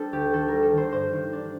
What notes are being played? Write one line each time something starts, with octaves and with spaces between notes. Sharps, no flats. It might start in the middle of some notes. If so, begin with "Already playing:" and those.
Already playing: G3 D4 A4 C5
D2 G4
D#3 A4
G3 A#4
A4
D#3 C5
G2 C5
D#3
D4